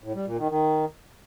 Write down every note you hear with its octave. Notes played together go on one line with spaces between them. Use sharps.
A2
G3
A#2
D#3
D#3